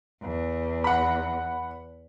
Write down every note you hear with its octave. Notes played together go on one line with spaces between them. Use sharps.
E2
F#5 B5